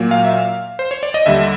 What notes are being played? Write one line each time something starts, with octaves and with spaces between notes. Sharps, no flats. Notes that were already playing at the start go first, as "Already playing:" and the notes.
Already playing: A#2 F#3 A#3
F5
E5
F5
C5
C#5
D5
D#5
D#2 D3 G3 E5